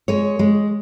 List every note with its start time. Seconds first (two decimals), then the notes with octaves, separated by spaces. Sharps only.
0.08 G#3 C#5
0.39 G#3